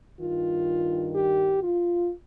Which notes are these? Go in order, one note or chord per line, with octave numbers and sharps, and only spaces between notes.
G2 D#3 F4
G4
F4